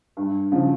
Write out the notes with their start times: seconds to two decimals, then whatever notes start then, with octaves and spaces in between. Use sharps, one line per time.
0.17 G2
0.52 C#3 F3